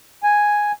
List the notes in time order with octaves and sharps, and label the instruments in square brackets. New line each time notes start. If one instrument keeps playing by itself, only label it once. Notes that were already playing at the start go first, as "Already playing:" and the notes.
[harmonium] G#5